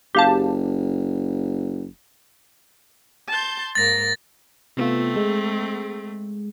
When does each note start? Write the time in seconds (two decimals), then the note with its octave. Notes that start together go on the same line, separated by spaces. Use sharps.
0.15 F#1 G4 F5 A5
3.28 A5 C6 G6
3.75 G#2 A#3 A6 A#6
4.77 C3 A3 B3 C4 F4
5.16 G#3